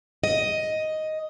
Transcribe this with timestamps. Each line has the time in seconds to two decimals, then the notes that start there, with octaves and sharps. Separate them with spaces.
0.24 D#5